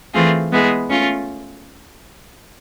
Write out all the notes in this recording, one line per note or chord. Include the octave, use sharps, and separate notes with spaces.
E3 A3 C4 F4 G#4
G#3 B3 E4 G#4
A3 C#4 F4